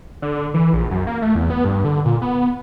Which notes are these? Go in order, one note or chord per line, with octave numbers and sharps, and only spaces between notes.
D3
E3
A#1
F#2
A#3
A3
E2
B3
G2
D3
A#2
B3